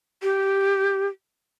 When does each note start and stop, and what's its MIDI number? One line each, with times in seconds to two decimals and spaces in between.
0.23 1.07 67